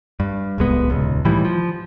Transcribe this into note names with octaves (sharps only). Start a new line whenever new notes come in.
G2
D1 C2 G#3 B3
D#1 C#2
A2 D#3 E3 G3
F3